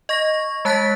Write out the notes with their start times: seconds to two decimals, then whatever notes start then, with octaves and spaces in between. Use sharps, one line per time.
0.09 D#5 C#6 A#6
0.65 G#3 A5 F#6 A6 B6